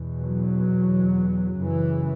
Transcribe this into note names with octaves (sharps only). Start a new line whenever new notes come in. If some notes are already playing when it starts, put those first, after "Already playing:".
Already playing: E2 B2
F#3
F#2 C#3 E3